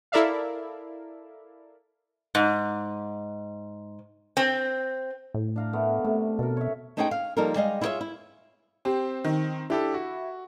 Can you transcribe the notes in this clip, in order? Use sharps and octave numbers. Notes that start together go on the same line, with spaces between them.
E4 A4 A#4 D5 E5 F5
G#2
C4
A2
D4 F5 A#5
A3 B3 A#4
C3 A3
B2 A4 A#4
C#5 E5
A3 C#4 D#4 G#4 C5 G5
F5
F3 G3 A#3 D#4 A4 A#4
G3 G#3 G#4 D#5 F5
E4 F4 G#4 A4 C#5 E5
E4
C4 G4 C5
D#3
D4 E4 G4 A4
F#4